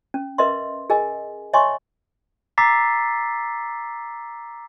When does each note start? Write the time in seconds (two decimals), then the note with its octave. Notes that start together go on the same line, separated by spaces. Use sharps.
0.14 C#4
0.38 A#4 B4 D#5 E5 C6
0.90 G#4 A#4 D#5 G#5
1.53 C#5 D#5 E5 G#5 C6 C#6
2.58 A#5 D6 E6 A6 B6 C7